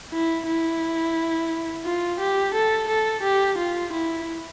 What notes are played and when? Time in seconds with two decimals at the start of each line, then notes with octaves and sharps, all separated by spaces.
0.13 E4
0.47 E4
1.85 F4
2.20 G4
2.54 A4
2.88 A4
3.23 G4
3.58 F4
3.92 E4